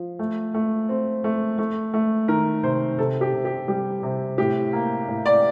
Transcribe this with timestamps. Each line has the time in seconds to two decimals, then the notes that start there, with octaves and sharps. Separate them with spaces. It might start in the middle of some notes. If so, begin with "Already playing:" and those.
Already playing: F3
0.19 A3
0.54 A3
0.89 C4
1.24 A3
1.59 A3
1.94 A3
2.28 D#3 A#4
2.63 C3 C5
2.99 C3 A4
3.21 G4
3.34 C3
3.45 G4
3.68 G3 G4
4.03 C3
4.38 A2 G4
4.73 A#3
5.08 A2
5.26 D5